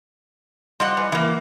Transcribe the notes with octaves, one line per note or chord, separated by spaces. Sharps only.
F3 G3 D#5 F#5 C6
E3
E3 A#3 E4